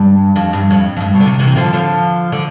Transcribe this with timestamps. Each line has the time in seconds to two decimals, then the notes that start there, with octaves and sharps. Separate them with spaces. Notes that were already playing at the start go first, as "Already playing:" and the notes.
Already playing: G2
0.36 F2
0.53 G2
0.71 F2
0.97 F2
1.01 G2
1.14 B2
1.20 D3
1.26 C3
1.39 C3 E3
1.56 D3 F3
1.73 D3 F3
2.32 D3